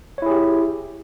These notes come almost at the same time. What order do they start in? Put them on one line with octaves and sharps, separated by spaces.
C#5 E4 G#4 G4